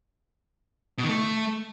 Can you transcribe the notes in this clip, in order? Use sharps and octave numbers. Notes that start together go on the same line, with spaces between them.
B2
D#3
A3